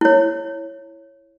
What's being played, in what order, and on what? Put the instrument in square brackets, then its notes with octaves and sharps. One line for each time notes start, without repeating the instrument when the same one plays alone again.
[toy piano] E4 C#5